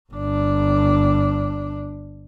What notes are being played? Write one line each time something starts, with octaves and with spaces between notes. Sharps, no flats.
G1 D4